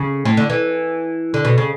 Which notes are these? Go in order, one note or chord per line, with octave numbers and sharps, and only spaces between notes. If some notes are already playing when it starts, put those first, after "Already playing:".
Already playing: C#3
A2
D3
E3
D3
B2
C#3